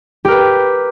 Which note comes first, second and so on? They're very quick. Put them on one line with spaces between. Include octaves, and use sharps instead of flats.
G4 A#4 B4